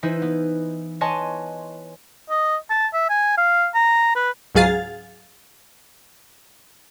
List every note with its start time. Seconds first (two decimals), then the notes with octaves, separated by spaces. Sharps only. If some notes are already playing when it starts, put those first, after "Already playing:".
0.03 E3 D#4 E4 B4 C5
0.22 B3
1.01 B4 C#5 D#5 G#5 A5 C6
2.30 D#5
2.70 A5
2.94 E5
3.09 G#5
3.38 F5
3.74 A#5
4.16 B4
4.55 C#2 G#2 F#3 G#4 F5 A6